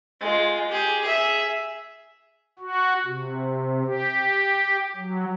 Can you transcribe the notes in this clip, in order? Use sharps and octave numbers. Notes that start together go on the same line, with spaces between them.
G#3 F4
G4 G#4
G#4 E5
F#4
C3
G4
F#3